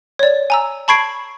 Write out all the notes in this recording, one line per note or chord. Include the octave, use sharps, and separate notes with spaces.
C#5 D5
G#5 A#5 E6
A5 B5 C#6 G#6 C7 D7